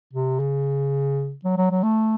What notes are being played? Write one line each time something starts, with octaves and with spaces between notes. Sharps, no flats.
C3
C#3
F#3
F#3
F#3
A3